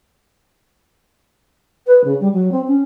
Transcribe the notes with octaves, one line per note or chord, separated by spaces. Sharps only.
B4
C#3
G3
F#3
C4
C#4